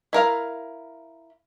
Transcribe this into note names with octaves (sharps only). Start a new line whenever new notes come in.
E4 A#4 F5